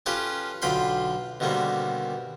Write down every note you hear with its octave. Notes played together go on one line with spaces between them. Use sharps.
C#4 F4 G4 A4 B4
B1 D3 F4 G5 B5 C6
B2 D3 D#3 G3 A#3 C4